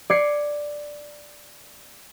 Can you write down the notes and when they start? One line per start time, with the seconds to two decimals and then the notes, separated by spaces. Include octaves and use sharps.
0.10 D5 G#6 C7 C#7